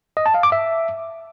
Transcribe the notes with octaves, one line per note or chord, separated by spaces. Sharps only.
D#5
A5
F5
D6
E5